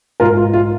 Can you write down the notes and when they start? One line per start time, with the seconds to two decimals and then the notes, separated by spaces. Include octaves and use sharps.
0.20 G#2 F4 A#4
0.37 F4
0.53 F4